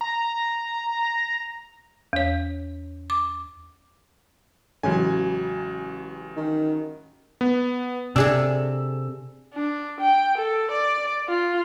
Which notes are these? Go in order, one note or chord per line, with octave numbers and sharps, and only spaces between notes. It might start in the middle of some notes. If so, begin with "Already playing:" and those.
A#5
E2 C#5
D6
A1 C#3 F#3 G#3 G#5
D#3
B3
C3 D4 G#4 A4 E6
D4
G5
A4
D5
F4